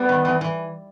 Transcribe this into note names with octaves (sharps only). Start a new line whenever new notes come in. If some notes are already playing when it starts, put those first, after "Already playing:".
Already playing: G3 B3
D#3
E3
E3